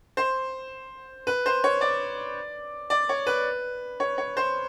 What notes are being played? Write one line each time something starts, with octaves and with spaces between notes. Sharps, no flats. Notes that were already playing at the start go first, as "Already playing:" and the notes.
C5
B4
C5
C#5
D5
D5
C#5
B4
C#5
C#5
C5